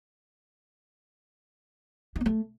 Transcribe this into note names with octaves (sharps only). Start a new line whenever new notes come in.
D#4
B3
A3